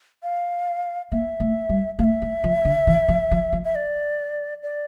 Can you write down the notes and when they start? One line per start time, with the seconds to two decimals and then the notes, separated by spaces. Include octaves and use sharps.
0.23 F5
1.11 A#3 E5
1.40 A3
1.69 G3
1.99 A3 F5
2.04 E5
2.22 A3
2.44 F3
2.65 D3
2.87 E3
3.08 F3
3.31 F3
3.52 F3
3.64 E5
3.75 D5
4.63 D5